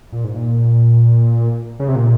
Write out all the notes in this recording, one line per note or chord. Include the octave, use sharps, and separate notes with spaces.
A#2
G#2
A#2
C#3
C3
A#2